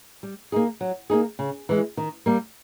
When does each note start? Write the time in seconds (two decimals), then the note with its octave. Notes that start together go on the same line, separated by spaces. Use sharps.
0.23 G3
0.52 A#3 D#4 G#4
0.81 F#3
1.10 A#3 D#4 G#4
1.39 C#3
1.69 E3 G#3
1.97 D#3
2.26 G3 A#3